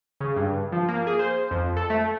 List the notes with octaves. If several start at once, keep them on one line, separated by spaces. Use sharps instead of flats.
C#3
G2
F3
A#3
G#4
C5
F2
A4
A3